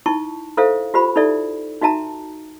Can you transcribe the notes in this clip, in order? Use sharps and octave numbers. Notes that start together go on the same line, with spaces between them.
D#4 E4 A5 C#6
E4 A4 C5 E5 F5
F4 G4 C5 B5
D#4 E4 A4 D5 E5
D#4 F#4 E5 A5 A#5